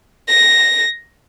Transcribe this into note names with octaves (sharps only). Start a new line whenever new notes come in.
A#6